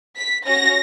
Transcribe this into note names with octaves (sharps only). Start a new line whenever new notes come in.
B6
C#4 F#4 A#6